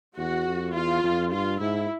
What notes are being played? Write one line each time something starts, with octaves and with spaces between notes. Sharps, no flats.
E2 F#4
F2
E2 F4
F2
G2 F4
G#2 E4